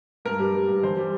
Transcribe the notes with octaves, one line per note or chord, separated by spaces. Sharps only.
G2 A#4
G3
G3
G2
E2 C5
G3